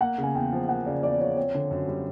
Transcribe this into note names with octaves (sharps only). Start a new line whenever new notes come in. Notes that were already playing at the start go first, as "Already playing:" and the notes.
A#3 F#5
C#3
G#5
E2 G5
F3
A#3 F#5
C#3 D5
E2 D5
F3 C#5
C4 C#5
D3
F#2
G3